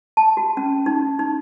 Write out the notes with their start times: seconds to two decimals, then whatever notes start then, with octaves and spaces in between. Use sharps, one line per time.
0.17 A5
0.37 F#4
0.57 C#4
0.86 D#4
1.19 D#4